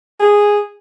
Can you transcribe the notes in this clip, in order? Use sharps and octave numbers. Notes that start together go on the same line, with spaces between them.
G#4